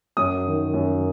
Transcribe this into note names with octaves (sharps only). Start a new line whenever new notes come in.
F#2 D#6
D#3
F#2